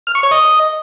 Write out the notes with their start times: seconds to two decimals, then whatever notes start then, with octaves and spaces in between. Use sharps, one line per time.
0.07 F6
0.15 C#6
0.23 C#5
0.31 D#5